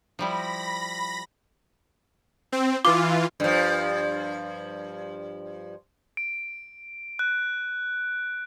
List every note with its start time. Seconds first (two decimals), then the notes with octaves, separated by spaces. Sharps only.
0.19 F3 G3 E4 B5 A#6
2.52 C4
2.85 E3 F4 D6
3.40 G2 F3
6.17 D7
7.19 F#6